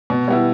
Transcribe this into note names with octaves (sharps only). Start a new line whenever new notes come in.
B2
G3 B3 E4